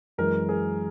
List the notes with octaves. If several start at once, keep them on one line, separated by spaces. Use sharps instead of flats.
F#2 E3 G#3 A#4
G#4